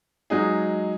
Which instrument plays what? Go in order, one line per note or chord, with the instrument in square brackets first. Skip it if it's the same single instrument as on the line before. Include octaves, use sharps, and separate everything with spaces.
[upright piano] F#3 G#3 D#4 G#4